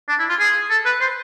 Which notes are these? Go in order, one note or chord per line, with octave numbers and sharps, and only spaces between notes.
D4
E4
F4
G#4
A4
B4
C5